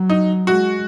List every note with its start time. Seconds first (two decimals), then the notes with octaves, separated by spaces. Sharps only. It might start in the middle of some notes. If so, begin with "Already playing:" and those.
Already playing: F#3
0.10 D#4
0.47 G#3 F#4